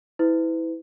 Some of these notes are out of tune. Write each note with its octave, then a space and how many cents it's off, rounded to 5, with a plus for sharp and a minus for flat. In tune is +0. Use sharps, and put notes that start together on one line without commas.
E4 -20 B4 +35